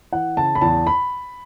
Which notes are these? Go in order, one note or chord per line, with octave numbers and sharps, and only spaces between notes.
E3 F#5
C#3 A5
B5
E2 A5
B5